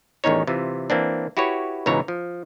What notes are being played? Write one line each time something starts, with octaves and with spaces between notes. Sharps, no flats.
A1 E2 D#3 C#4 D#4 C#5
C3 E3 F4
E3 A#3 C4 D4
E4 F#4 G4 B4 C#5
C#2 G#2 B2 E3 C#5 A#5
F3